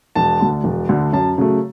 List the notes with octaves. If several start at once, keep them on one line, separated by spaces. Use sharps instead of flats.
E1 A5
D2 D3
E1
D2 D3
F#2 A5
C#3 F#3 A3